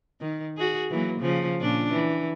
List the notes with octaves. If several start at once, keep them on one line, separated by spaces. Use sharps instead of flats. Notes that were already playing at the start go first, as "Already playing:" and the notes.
D#3
F#4 G#4
E3 F#3 A#3
C#3 F3
A#2 C#4 D4
E3